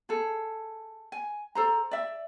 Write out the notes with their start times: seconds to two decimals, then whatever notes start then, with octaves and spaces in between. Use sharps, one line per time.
0.09 G#4 A4
1.12 G#5
1.55 A4 C5 A#5
1.91 D5 E5